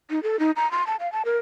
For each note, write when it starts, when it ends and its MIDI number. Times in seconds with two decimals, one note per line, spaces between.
0.10 0.22 63
0.23 0.39 69
0.39 0.51 63
0.56 0.70 82
0.72 0.86 84
0.87 0.96 81
1.00 1.11 77
1.12 1.22 81
1.25 1.40 70